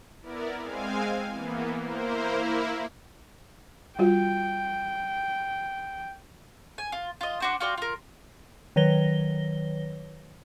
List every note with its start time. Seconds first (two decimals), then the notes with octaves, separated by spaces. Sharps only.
0.21 B3 E4 A#4 D5
0.60 G#3 C4 F5 G#5
1.31 E3 A#3 B3
1.82 A#3 E4 A#4 C5
2.37 A#3 E4
3.99 G3 F4 F#4 G5
6.78 G#5
6.92 F4
7.21 F4 D#5
7.40 D4 F#4 C5
7.60 F4 F#4 D5 G5
7.78 F4 A#4
8.76 D#3 F#3 B4 C#5 A#6 G7